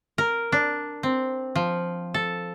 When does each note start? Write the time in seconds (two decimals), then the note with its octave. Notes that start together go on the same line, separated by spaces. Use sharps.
0.18 A#4
0.52 D4
1.03 C4
1.55 F3
2.14 A4